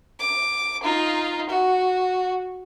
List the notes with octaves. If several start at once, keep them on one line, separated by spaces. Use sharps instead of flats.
D6
D#4 F4
F#4